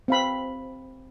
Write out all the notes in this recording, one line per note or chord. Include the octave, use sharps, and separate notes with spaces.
C4 F5 B5